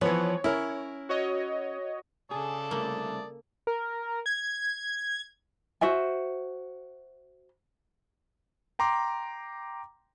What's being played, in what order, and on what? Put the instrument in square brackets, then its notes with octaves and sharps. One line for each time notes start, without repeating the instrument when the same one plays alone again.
[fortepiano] E3 B3 [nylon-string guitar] F3 [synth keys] C#5
[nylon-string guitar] C#4 [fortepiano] E4 A#4
[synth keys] F#4 C#5 D#5
[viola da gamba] C#3 A4 [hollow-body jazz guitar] G#4 [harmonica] D5 A5 D#6
[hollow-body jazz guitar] C2 A3 [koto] A#3
[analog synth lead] A#4
G#6
[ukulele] F#4 C5 E5 G#5
[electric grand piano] G5 A#5 C6 D6